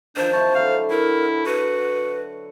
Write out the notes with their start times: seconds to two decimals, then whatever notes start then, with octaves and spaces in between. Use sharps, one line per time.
0.16 D#3 F3 D4 C5
0.33 C3 E4 A5 C#6
0.55 D3 F#3 A4 F5
0.90 E4 A#4
1.46 F#4 B4